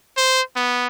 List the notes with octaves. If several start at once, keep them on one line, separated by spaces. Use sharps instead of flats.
C5
B3